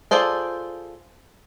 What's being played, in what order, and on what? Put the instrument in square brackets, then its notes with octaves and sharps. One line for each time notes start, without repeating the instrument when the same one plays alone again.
[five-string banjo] F4 G#4 A4 C5 D5